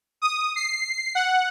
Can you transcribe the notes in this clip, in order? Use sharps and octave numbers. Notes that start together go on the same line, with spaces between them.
D#6
C7
F#5